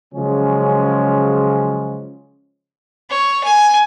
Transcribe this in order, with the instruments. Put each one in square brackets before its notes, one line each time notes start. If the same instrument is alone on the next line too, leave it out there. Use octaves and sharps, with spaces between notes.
[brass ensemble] C#3 F3 F#3 G#3 C#4
[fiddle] C#5
G#5